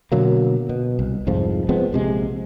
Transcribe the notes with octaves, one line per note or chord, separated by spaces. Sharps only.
B2 D3 F#3 A#3
B2
C2
C2 F2 G#2 F3
F3 G#3 B3 C4
A#1 C3 G#3